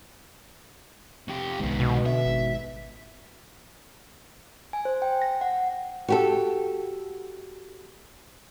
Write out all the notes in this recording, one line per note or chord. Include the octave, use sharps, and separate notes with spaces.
F2 G4
C2 G#2 D#3 B3
B2
D3 E5
G#1 G#2
G#5
C5
G5
A#6
F#5
F#4 G4 A4